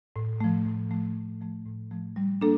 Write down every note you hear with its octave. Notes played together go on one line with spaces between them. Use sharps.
A2
F3 A3
A2
F3 A3
A2
F3 A3
A2
F3 A3
G3
A#3 D4 A4